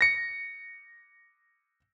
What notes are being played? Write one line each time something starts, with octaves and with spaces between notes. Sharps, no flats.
A#6 C#7